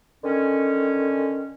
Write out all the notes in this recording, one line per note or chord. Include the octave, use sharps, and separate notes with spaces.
D3 D#3 C#4